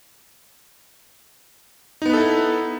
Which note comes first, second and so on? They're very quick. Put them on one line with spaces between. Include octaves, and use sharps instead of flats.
D#4 B3 B4 A4 E4